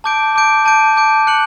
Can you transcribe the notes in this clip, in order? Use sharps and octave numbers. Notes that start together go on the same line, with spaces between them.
A5 D6 G6 D7
A5 D6 G6 D7
A5 D6 G6 D7
A5 D6 G6 D7
F#6 C#7 F#7